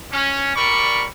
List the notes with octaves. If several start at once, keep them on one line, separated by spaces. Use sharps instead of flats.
C#4
G3 A#4 D5 B5 C#6